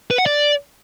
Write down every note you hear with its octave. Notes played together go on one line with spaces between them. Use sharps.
B4
F#5
D5